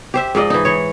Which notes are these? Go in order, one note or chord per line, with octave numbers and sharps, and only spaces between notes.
G4 C5 E5
G#2 F3 D5 D#5
E3 D#4
E3 C#5